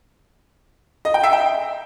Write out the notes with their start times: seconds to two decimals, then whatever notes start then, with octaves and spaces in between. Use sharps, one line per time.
1.05 D#5
1.14 G5
1.24 E5
1.33 G5